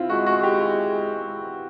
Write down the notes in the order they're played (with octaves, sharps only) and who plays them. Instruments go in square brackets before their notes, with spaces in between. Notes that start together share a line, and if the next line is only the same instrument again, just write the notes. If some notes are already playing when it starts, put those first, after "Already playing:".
Already playing: [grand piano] C4 E4 F4
[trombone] G#3 [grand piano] F#4
[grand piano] F#4
G4